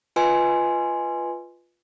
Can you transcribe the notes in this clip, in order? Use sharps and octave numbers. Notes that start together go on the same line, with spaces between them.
F4 B4 D#5 G#5 C6